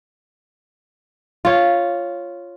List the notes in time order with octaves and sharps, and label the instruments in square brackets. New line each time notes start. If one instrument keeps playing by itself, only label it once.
[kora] F4 C#5